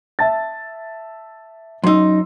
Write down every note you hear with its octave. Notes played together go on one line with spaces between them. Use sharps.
E5 A5 A6
F#2 D#4 C6 E6